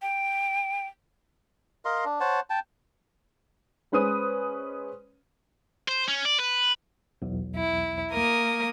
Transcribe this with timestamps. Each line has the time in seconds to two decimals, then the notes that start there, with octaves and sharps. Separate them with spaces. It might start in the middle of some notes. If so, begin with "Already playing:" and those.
0.02 G5
1.85 A#4 D#5 F5 C6
2.05 D4
2.20 C5 C#5 F#5 A5
2.50 G5 A5
3.92 G#3 C#4 B4 C5 D#6 D#7
5.88 C5
6.09 C#4
6.25 D5
6.39 B4
7.22 B1 E2
7.56 E4
8.12 A#3 A#4 D#6